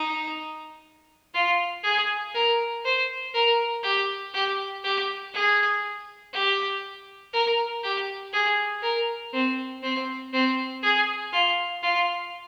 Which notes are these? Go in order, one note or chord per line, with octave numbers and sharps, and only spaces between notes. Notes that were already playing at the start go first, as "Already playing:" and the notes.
Already playing: D#4
F4
G#4
A#4
C5
A#4
G4
G4
G4
G#4
G4
A#4
G4
G#4
A#4
C4
C4
C4
G#4
F4
F4